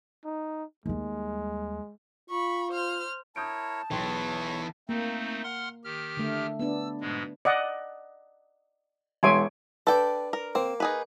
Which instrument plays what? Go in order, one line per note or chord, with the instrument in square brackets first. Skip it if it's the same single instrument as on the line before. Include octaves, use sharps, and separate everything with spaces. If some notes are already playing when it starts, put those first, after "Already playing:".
[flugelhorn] D#4
[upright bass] D#2 G3 [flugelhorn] G#3
[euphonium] F4 [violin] B5 C#6
[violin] C5 F6
[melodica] E4 A#4 C#5 [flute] A5 [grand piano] D#6 G6 D7
[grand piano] B1 G5 C6 [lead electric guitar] E3 B3 [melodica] C#5
[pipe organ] A3 C4 D#4 [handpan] A#3
[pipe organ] F#5 C6 F6
D#3 G4 F6
[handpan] D3 A3
[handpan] B3 D4 [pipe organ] E6
[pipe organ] G#2 B2 G#3
[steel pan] D5 D#5 F#5
[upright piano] E1 C6 D7 [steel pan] C#5 E5 G#5
[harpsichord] D4 B4 [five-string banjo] A4 G5
[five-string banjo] A#4
[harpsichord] A#3 [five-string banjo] C4
[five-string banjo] D#4 G#4 B4